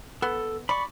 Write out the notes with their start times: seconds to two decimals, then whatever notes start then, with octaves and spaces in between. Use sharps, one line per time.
0.22 B3 A4
0.69 D5 B5 C#6